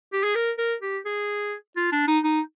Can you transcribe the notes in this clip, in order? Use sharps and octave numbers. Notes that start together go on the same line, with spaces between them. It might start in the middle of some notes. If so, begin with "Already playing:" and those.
G4
G#4
A#4
A#4
G4
G#4
F4
D4
D#4
D#4